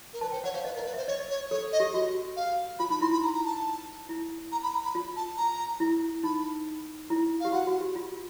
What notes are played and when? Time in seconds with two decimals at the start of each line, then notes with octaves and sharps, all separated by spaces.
0.13 A#4
0.21 B4 A5
0.32 C5 G5
0.44 C#5 F#5
0.54 C5 F5
0.65 B4 D#5
0.75 A#4
0.79 D#5
0.86 B4
0.94 C5 E5
1.08 C#5 D#5
1.30 C#5
1.51 A4 C#5
1.72 D#5
1.80 G4
1.93 F#4 D#5
2.36 F5
2.79 F4 B5
2.90 D#4 B5
3.01 E4 C6
3.12 F4 B5
3.23 A#5
3.34 A#5
3.44 A5
4.09 E4
4.52 A#5
4.63 B5
4.74 A#5
4.84 B5
4.95 F4
5.16 A5
5.37 A#5
5.80 E4
6.23 D#4 B5
7.10 E4
7.40 G4 F5
7.52 F#4 F#5
7.67 F#4
7.81 G4
7.96 F4